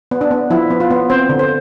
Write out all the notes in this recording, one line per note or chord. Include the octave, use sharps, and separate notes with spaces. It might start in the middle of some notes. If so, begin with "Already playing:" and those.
B3
D4
B3
F3 E4
B3
F4
B3
C4 C5
D3
C5